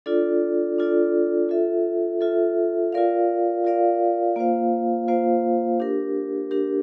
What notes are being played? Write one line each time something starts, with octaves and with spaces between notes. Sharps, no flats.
D4 F4 A4 D5
D4 F4 A4 D5
F4 A4 E5
F4 A4 E5
F4 A#4 D5 F5
F4 A#4 D5 F5
A#3 F4 C5 F5
A#3 F4 C5 F5
D4 G4 A#4
D4 G4 A#4